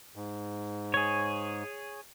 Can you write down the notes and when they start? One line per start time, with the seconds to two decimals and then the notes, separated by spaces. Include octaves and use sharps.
0.16 G#2
0.94 G#4 C#5